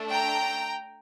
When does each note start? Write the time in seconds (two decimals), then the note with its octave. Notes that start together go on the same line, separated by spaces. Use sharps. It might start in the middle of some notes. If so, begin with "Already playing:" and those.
Already playing: A3 D4 A4
0.11 G5 A#5